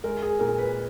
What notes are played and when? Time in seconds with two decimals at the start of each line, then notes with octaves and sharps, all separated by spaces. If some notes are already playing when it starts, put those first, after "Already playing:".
0.04 G#3 A#4
0.22 G#4
0.39 A#2 A#4
0.58 B4